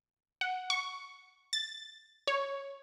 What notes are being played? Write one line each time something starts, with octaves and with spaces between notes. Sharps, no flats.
F#5
C#6
A6
C#5